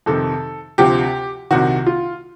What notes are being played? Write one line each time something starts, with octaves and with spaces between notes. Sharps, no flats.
F2 C3 D#3 A4
D2 C3 F3 G4
C2 C3 D#3 F#4
F4